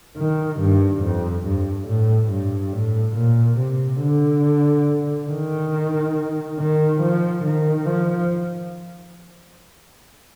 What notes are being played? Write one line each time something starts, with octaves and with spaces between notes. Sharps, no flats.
D#3
G2
F2
G2
A2
G2
A2
A#2
C3
D3
D#3
D#3
F3
D#3
F3